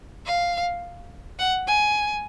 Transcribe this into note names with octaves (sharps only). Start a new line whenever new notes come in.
F5
F#5
G#5